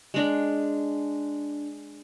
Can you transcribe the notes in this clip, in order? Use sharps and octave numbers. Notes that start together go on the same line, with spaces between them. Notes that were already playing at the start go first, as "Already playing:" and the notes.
G#3 D4